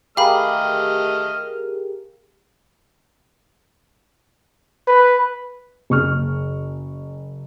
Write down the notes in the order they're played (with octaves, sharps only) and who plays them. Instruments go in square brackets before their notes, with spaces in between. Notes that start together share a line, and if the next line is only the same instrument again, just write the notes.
[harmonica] A3 D#5 F6 [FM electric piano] G4 G#4 A#4 [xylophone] F5 B5
[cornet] B4
[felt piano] F#1 C#6 F6